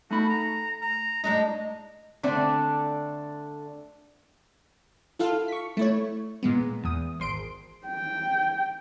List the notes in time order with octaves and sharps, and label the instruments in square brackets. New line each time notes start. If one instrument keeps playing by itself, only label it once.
[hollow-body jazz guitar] A3 D#4 B5 [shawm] F#4
[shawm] A#5
A#5
[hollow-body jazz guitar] A2 [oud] G#3 D4 D#4 [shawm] A#5
[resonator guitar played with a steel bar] D3 A3 C4 D4
[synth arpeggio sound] E4 F4 A4 F5
C#6 B6
A3 E4 C#5
A#2 G#3 B3
E2 D#6
G#1 C6 D7
[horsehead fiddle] G5